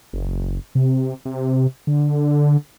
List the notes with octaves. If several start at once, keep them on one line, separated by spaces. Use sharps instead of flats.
F#1
C3
C3
D3